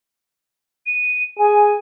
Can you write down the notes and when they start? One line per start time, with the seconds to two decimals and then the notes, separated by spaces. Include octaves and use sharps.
0.86 D#7
1.39 G#4 G#5